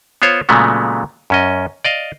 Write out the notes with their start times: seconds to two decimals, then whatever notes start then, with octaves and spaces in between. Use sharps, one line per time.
0.22 B3 F4 C5 C#5
0.49 A#2 C#3 F#3 G#3 A3 B3
1.30 F#2 C#4 D#5
1.85 D5 D#5 F5